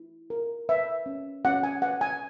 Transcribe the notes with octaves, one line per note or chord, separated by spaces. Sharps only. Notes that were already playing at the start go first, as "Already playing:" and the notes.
Already playing: E4
A#4
B4 E5
C#4
C#4 F#5
G#5
B4 F#5
G#5